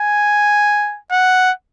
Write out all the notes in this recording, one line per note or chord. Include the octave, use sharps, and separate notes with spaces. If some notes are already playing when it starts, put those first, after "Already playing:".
Already playing: G#5
F#5